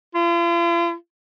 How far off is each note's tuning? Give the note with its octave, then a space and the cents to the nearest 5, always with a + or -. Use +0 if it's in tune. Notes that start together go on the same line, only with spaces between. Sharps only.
F4 -45